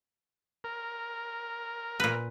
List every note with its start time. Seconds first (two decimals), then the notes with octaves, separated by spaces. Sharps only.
0.64 A#4
2.00 A#2 B4